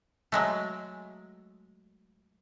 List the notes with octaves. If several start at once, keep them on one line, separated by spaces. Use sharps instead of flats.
F#3 G#3 A3